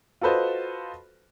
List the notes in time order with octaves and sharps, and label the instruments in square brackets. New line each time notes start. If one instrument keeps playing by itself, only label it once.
[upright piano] F4 F#4 A4 B4 C5 D#5